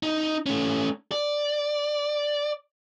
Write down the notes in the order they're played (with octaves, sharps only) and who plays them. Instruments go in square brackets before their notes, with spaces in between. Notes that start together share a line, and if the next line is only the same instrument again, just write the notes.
[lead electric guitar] D#4
A3 C#4
D5